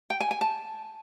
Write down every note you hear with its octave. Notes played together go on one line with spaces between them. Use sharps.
G5
G#5
G#5
A5